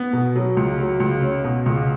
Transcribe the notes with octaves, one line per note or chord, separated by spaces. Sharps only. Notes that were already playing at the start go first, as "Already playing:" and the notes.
Already playing: B3
B2
F#3
C#2
F#3
C#2
C#4
B2
C#2